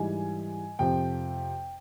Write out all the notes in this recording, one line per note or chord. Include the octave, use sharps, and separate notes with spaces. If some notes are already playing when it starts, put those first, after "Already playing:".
Already playing: G#2 E3 G3 G#5
F2 C3 F3 G5